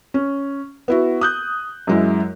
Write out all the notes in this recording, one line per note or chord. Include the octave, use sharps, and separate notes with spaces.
C#4
B3 E4 F#4
D#6 F#6 G6
F#2 G#3 E4